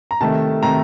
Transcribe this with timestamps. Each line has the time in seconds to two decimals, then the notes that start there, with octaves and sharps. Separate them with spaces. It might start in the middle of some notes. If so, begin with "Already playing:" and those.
0.11 A#5
0.21 C3 D#3 A3 A5
0.63 C3 D#3 A3 A#5